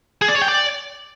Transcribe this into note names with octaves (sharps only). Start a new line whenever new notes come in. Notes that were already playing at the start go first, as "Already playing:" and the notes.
G#4
D5
C#5
G5
D5